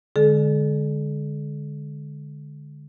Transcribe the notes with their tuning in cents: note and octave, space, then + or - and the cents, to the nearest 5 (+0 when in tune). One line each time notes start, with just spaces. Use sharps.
D3 +0 G#3 +0 A4 -40